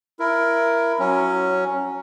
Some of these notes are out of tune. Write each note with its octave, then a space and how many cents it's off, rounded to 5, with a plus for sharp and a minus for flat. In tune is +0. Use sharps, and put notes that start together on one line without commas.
E4 +20 A#4 +10
F#3 +0 C#4 +0